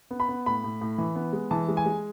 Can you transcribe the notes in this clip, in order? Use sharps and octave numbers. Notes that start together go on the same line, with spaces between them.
B3
B5
B3
A2 B5
A2
A2
E3
B3
G#3
E3 A5
G#3
G#5
G#3